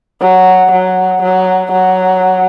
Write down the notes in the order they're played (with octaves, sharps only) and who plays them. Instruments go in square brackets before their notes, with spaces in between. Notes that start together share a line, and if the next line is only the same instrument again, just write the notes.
[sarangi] F#3
F#3
F#3
F#3